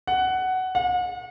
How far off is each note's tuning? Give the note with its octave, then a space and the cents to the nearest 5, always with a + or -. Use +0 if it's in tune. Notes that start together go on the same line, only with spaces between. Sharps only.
F#5 +10
F#5 -40